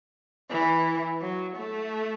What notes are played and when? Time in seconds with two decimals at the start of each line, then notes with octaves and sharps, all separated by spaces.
0.51 E3
1.21 F#3
1.57 A3